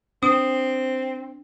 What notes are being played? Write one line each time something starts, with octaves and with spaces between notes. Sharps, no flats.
C4 D4 D#6